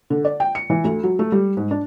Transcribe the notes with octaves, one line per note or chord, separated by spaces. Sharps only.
D3
D5
G5
C#7
E3
D2
F#3
A3
G3
G#2
D4